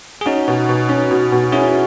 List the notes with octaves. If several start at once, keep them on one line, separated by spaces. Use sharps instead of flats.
G#4
C#4 D#4 F#4
B2
B2
C#4
B2
B2
C#4 E4 G#4